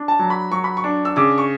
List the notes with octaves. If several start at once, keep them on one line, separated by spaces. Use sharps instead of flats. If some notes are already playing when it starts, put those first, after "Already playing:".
Already playing: D4
A5
F#3
B5
F#3 C#6
B5
C#6
D4
E6
C#3 D6
C#6